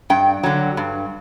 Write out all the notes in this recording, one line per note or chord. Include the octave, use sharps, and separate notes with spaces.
G2 G5
D3 F#3
G2